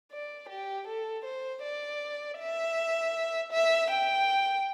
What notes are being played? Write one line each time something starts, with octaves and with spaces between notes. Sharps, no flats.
D5
G4
A4
C5
D5
E5
E5
G5